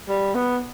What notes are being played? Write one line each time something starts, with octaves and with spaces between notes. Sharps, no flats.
G3
B3